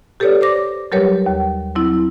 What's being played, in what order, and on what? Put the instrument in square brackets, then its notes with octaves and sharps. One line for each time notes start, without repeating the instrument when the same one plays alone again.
[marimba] G4 A4 B4 C#5 D5
C5 D5 D6 A#6
F#3 G3 G4 A#4 B4 C#5
D#2
F#3 C4 E4